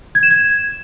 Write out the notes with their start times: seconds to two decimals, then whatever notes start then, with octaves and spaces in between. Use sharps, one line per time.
0.15 G#6
0.23 E7
0.31 G#6